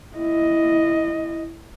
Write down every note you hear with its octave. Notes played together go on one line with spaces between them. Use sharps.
E4 D#5